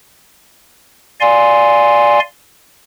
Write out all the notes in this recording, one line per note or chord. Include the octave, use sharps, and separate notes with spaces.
D5 F5 G#5 C6